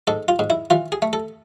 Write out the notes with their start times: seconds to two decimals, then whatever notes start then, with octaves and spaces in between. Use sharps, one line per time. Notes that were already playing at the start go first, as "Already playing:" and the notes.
0.07 G#2 A4
0.28 F4
0.39 G#2
0.50 E4
0.70 E3 F4
0.92 G#4
1.02 A3
1.13 A4